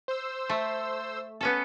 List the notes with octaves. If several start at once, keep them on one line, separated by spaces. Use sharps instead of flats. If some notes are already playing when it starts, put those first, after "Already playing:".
C5 E6
A3
B3 C#4 A4